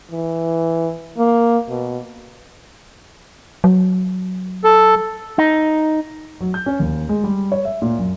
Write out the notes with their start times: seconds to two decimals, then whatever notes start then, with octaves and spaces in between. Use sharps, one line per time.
0.11 E3
1.18 A#3
1.69 B2
3.64 F#3
4.64 A4
5.38 D#4
6.41 F#3
6.54 G6
6.66 C#4
6.80 D#2
7.09 G#3
7.24 G3
7.52 C#5
7.65 E5
7.82 A#2
7.98 F#2